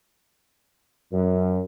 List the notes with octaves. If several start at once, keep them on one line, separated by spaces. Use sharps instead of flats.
F#2